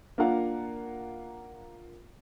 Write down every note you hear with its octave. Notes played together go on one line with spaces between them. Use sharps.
A#3 D4 F4 A#4 F5 F#5